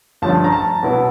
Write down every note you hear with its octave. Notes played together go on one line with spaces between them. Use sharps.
G2 D3 F3 A3 C#4 A5
A#5
A5
B2 F#3 B3 E4